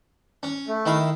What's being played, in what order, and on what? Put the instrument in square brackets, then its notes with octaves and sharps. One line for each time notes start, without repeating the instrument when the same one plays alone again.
[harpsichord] C#4
[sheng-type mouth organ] A3
[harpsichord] D#3 E4 F5